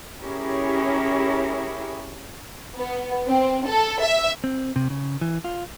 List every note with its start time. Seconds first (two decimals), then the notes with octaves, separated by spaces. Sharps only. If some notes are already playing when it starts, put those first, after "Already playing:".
0.20 C#4 E4 G4 G#4 A#4 C#5
2.77 B3
3.27 C4
3.66 A4
4.02 E5
4.44 C4
4.76 C3
4.90 C#3
5.21 E3
5.44 F4